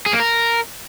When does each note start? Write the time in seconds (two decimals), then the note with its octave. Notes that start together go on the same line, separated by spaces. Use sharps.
0.06 G#4
0.13 A#3
0.20 A#4